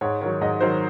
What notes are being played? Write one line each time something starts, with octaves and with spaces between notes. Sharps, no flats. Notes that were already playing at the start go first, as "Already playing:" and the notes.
G#2 C#5
D#3 F#3 C#5
G#2 D#5
D#3 F#3 C5